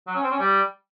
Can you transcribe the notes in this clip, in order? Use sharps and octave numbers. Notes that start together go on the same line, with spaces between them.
F#3
C#4
C4
C#4
G3